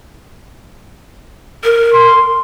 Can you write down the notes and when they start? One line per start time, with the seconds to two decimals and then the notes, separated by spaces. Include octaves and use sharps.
1.64 A#4
1.93 C6